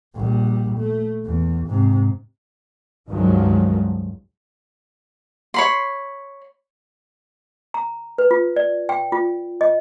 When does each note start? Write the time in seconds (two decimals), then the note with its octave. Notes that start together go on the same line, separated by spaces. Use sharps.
0.16 A#1 G3
0.78 A3
1.25 E2
1.67 G#2 C3
3.09 C#2 G2 D#3 F3 F#3 G#3
5.54 C#5 B5 C6
7.74 A#5
8.18 B4
8.31 F4
8.56 D5
8.89 G5
9.12 F4
9.61 D#5